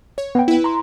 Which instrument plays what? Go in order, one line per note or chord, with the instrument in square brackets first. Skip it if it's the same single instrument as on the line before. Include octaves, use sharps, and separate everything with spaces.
[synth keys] C#5
[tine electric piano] B3 G5
[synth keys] E4 B4
[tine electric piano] A#5 C6